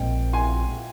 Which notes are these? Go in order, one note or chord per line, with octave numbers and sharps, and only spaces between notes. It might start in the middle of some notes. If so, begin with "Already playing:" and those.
Already playing: A#1 A#2 G#3 C4 G5
G#5 C6